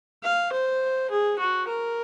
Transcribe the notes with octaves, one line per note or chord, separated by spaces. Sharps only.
F5
C5
G#4
F#4
A#4